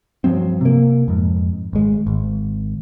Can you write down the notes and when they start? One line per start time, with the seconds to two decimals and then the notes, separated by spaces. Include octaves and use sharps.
0.24 G2 F3 F#3 C4
0.61 C3 A#3
1.08 F2 G#2
1.73 G#1 G#3
2.07 G#1